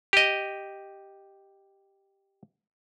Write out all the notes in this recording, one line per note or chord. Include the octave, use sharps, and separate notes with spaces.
G4 D#5